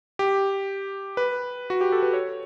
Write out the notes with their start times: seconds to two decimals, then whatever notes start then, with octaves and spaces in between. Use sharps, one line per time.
0.19 G4
1.17 B4
1.70 F#4
1.81 G4
1.92 A4
2.03 B4
2.13 C#5